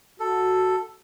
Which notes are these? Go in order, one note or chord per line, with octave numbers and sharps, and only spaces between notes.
F#4 A4